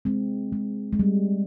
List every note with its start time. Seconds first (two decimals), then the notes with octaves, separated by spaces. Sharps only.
0.05 G#3 C4
0.53 G#3
0.93 G#3
0.99 G3